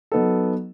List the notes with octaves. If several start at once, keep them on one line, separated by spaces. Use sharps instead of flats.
F#3 B3 D#4 A4